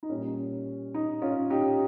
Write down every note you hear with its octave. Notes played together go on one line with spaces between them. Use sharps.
D#4
A#2 G3 C#4
D#4
C#4 F4
D#4 G4